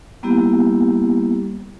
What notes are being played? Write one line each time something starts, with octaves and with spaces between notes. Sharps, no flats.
G3 A#3 B3 E4 G4